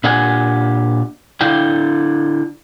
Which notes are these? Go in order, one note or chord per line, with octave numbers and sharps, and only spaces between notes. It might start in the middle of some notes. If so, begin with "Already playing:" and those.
A#2 D4 G4 F#5 G#5
D3 D4 E4 F5 G5